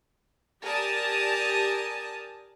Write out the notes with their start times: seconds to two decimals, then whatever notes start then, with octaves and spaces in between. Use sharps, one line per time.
0.63 G4 A#4 D5 G#5 A5 D#6